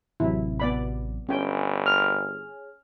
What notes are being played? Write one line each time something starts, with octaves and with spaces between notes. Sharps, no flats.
A1 C3 F#3 E4
B3 D5 B5
G1 C#4 G#4 C#5 G5 G#5
F6